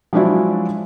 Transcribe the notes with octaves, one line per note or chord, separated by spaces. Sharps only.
F3 F#3 G#3 D4 E4 F#4